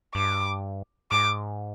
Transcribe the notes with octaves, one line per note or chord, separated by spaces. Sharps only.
G2 D6
G#2 D6